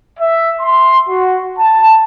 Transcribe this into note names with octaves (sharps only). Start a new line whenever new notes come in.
E5
C6
F#4
A5